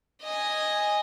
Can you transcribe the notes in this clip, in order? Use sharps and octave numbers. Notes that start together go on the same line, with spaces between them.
D#5 G#5